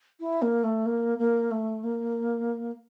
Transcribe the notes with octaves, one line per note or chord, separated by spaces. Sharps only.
E4
A#3
A3
A#3
A#3
A3
A#3